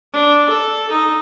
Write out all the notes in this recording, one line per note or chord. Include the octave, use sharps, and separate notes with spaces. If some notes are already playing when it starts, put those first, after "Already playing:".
D4
A4
D#4